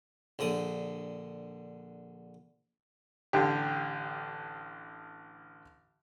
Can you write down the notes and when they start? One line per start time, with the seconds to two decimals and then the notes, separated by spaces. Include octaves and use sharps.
0.39 A#1 D3 D#6
3.33 A1 D3 G4